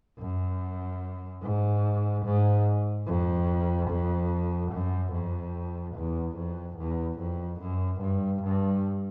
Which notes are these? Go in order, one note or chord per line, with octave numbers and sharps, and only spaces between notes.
F#2
G#2
G#2
F2
F2
F#2
F2
E2
F2
E2
F2
F#2
G2
G2